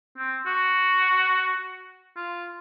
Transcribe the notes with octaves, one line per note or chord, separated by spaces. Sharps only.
C4
F#4
F4